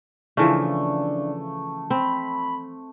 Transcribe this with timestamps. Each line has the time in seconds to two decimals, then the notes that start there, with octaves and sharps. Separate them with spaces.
0.37 C#3 E3 F3 A3 D4
1.90 C4 B5